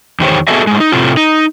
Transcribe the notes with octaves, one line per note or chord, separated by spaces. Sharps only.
E2 D#3 G4 C5 C#5
B3 F#4 G#4 A4 D#5 E5
A2 G#3
D#4
A2 C3 A3 C4 F4
D#4